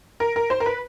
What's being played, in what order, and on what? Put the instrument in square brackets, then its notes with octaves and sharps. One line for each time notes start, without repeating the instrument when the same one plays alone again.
[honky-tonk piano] A#4
A#4
C5
A#4
B4